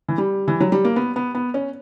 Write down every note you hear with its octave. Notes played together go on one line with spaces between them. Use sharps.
E3
G3
E3
F#3
G3
A#3
B3
B3
B3
C#4